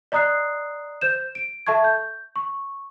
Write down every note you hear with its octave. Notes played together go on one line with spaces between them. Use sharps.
D5 D#5 A#5 D#6 F#6 C7
C5 G6 E7
D7
A4 E5 A5 C#6 G#6
G6
C#6